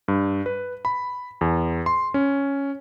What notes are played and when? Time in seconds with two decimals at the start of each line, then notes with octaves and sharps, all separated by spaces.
0.08 G2
0.46 B4
0.85 B5
1.41 E2
1.86 C6
2.14 C#4